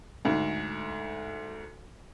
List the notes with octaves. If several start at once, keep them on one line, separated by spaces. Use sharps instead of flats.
D2 G#2